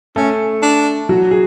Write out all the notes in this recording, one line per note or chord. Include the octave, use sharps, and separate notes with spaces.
A3 C#4 A4
D4
F#3 F#4
G#4